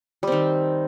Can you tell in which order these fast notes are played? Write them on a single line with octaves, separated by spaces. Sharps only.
G3 C4 D#3